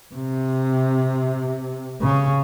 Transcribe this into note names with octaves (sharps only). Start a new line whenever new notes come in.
C3
C#3